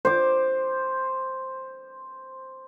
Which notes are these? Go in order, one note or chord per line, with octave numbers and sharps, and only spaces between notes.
C5 D6